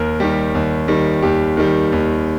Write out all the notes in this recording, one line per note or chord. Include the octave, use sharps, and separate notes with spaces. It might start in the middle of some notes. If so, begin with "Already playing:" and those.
Already playing: D#2 A#4
D#3 G3 G4
D#2
D#3 G3
D#2 G4
D#3 G3
D#2